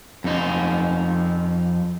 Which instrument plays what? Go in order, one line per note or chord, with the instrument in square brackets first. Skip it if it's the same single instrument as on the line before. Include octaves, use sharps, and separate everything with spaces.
[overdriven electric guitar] F2 D#4